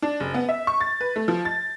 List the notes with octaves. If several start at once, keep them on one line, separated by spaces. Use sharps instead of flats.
D4
F#1
B3
E5
C#6
A6
B4
A3
F3
A6